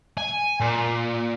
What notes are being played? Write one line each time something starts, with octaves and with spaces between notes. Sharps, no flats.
G#5
A#2